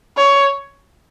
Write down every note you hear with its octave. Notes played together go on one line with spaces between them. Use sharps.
C#5